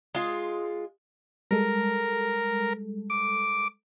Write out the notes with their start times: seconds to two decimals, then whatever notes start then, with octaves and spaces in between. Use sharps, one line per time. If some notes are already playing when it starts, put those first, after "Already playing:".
0.15 G#3 F4
1.51 G3 G#3 A4 A#4
3.10 D6